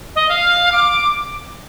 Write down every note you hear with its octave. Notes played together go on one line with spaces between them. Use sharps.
D#5
F5
D6